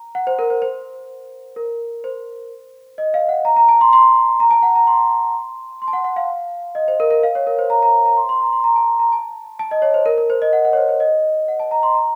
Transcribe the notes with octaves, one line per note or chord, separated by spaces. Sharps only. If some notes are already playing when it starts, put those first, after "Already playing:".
Already playing: A#5
F#5
C5
A#4
C5
C5
A#4
C5
D#5
F5
F#5
A#5
A#5
A5
C6
C6
A#5
A5
F#5
A#5
C6
C6
A5
F#5
F#5
F5
D#5
C5
A#4
A#4
F5
C#5
A#4
C5
A#5
A#5
A#5
C6
C6
A#5
C6
A#5
A5
A#5
A5
A5
D#5
C#5
C5
A#4
A#4
C5
D#5
F#5
F#5
C#5
C5
C5
D#5
F#5
A5
A#5
C6
A#5